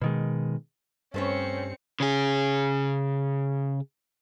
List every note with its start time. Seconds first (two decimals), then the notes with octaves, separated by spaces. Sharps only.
0.02 B2 D#3 G#3
1.14 G2 A3 C4 C#4 B4 C#5 C#7
2.00 C#3 G#4